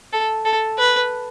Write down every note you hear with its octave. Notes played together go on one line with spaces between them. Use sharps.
A4
A4
B4